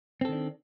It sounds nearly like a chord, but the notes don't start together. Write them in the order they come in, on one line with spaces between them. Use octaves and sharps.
C4 A4 D#3 D4